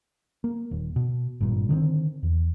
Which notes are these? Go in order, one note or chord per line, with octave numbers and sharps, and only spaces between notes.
A#3
D#1 D#2
B2
G#1 G2 A#2
D3 D#3 A3 C4
E2